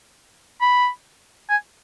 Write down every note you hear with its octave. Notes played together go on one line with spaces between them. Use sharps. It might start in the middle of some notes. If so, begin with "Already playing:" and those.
B5
G#5